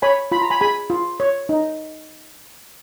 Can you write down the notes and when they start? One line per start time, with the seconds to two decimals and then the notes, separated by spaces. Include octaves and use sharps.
0.02 C#5 G#5 B5
0.32 F4 B5
0.42 A#5
0.50 G#5 B5
0.61 G#4 G#5 B5
0.90 F4
1.20 C#5
1.49 D#4